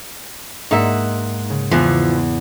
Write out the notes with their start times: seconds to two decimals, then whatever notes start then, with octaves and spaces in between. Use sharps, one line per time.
0.71 G#2 A#3 D#4 E5 F#5
1.50 C#3
1.71 E2 E3 F3 B3